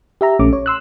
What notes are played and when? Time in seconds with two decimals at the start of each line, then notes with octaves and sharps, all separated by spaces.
0.21 G4 E5 A#5
0.39 A#1 A3 C#4 D6
0.53 C#5
0.66 C6 E6 F#6